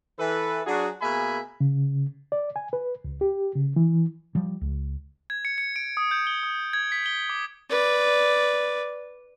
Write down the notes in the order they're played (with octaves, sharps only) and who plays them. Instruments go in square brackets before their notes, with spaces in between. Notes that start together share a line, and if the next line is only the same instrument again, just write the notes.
[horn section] E3 A4 B4
F#3 D4 F#4 G#4
B2 A#3 G#4 E5 G#5 B5
[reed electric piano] C#3
D5
G#5
B4
C#2
G4
C#3
E3
[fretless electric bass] F3 G3
C#2
[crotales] G#6
C#7
C#7
D7
D#6
G6
G7
D#6
G#6
B6
G7
D6
[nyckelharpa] B4 D5